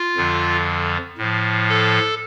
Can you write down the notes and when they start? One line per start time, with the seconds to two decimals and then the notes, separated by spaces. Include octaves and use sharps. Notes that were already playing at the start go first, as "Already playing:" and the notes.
Already playing: F4
0.17 F2 D3 F3
1.18 A2 F3
1.69 A4